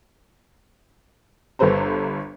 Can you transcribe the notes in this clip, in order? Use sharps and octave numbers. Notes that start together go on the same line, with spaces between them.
G1 G2 A4 B4 C5 A#5